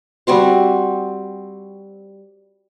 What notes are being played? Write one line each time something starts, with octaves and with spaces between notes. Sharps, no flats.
G3 C4 F#4 C5